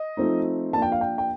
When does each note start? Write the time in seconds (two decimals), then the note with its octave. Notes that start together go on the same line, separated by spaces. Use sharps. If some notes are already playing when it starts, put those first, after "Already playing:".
Already playing: D#5
0.17 F3 A3 C4 D#4
0.73 F3 A#3 D4 A5
0.82 G5
0.92 F5
1.01 G5
1.18 G5